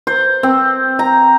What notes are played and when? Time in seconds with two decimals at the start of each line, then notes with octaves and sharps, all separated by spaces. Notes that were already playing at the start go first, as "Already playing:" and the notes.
0.07 C5
0.43 C4
0.99 A#5